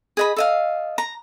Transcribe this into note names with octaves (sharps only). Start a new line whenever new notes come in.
G#4 D#5 B5
A4 D#5 F5
A#5